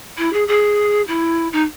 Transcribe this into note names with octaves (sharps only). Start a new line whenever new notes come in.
E4
G#4
G#4
E4
D#4